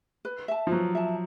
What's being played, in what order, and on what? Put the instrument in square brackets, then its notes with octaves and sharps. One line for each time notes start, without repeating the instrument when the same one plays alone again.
[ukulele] B4
E5 A5
[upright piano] F3
[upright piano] F#3 [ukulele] B4
[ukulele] E5 A5